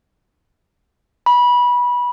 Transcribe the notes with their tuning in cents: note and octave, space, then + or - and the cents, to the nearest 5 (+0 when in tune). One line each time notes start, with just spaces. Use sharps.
B5 -20